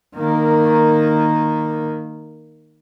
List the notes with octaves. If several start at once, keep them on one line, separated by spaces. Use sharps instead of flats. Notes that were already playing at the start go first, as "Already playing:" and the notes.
D#3 A#3